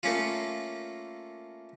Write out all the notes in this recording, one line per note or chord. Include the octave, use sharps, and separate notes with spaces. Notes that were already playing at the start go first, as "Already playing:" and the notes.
A3 A#3 C#4 F4